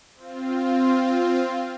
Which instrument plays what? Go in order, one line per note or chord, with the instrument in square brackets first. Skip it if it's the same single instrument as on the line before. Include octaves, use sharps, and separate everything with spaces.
[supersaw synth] C4 F4